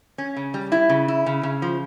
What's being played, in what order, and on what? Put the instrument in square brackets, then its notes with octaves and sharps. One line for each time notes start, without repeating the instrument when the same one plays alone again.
[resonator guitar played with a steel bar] C#4
C#3
G3
E4
C#3
E4
C#3
C#3
F3